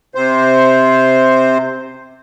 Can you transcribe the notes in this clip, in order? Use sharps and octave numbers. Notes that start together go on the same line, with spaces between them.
C3 C5